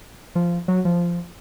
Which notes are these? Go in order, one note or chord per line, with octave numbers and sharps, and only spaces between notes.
F3
F#3
F3